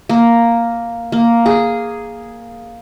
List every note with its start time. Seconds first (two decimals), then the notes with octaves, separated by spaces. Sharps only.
0.09 A#3
1.12 A#3
1.46 G#4